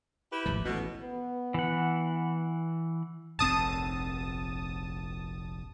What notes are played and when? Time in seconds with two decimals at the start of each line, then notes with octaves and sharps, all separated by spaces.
0.33 E4 G4 B4
0.46 D1 G#1 F3
0.65 A1 B2 A3
1.02 B3
1.54 E3 F#5
3.39 F1 A#1 C4 A5 D#6